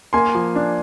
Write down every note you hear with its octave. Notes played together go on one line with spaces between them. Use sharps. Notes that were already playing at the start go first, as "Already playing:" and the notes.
A#3 G#5 C6
F3
D4